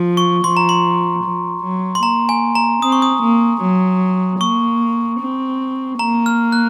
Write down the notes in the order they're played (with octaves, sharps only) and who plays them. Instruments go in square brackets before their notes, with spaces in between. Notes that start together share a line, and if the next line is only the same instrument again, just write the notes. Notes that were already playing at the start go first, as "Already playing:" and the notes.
Already playing: [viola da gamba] F3
[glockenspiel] C#6
[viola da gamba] F3 [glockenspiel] C6
[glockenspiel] A#5
C6
[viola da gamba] F3
F#3
[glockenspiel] C6
[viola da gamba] A#3 [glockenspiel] A#5
[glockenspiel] G#5
A#5
[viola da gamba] C4 [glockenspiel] D#6
[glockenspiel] C#6
D#6
[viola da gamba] A#3
F#3
[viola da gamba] A#3 [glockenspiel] C#6
[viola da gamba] C4
[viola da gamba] A#3 [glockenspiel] A#5
[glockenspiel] F6
F#6